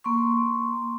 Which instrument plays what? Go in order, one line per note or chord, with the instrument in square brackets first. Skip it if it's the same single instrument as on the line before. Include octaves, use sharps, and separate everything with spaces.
[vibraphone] A#3 C6 C#6